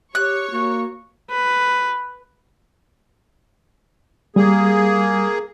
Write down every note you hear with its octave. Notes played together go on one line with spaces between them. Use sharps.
G4 C#5 C#6 F#6
A#3 F#4
B4
G3 A#3 G#4